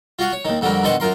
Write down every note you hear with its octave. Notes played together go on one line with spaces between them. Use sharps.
F4 F#4 F5 F#5
C#5
D#2 D#3
F2 D3 F#3 G3 A#4
B2 D3 D#3 D#5 C6 C#6
F#2 F4 A#4 C6